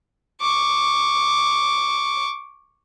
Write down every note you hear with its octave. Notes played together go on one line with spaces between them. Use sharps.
C#6 D6